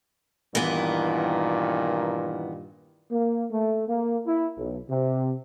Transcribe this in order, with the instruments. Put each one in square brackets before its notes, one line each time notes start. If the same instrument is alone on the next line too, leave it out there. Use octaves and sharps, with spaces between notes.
[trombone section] G2 A#2 D#3 [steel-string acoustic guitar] E3 B3
[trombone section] A#3
A3
A#3
E4
B1
C3